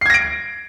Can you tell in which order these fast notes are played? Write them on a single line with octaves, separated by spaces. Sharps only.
C7 G#6 A#6 D7